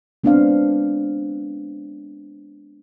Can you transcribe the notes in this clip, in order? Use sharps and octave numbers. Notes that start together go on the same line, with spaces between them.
G#3 B3 C4 D4 C5 F5